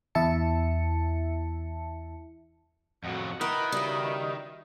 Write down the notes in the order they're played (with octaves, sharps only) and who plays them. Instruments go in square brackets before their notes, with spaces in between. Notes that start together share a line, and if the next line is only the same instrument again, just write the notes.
[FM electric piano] E2 E4 E5 A5 C#7
[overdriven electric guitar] F2 A2 [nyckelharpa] F#4 F#5
[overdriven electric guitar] D#3 [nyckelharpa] E4 [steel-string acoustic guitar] A#4 F#5 [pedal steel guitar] B4
[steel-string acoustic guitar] C#3 G3 [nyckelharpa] F#4 E5